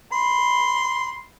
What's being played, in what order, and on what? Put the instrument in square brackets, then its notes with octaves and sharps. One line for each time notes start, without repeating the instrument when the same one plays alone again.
[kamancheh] B5 [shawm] C6